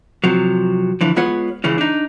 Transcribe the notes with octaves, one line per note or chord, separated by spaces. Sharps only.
C3 F3 F#3
D3 E3 F3
G#3 B3 F4 B4 C#5 F#5
C#2 C#3 E3 C#4
D4 D#4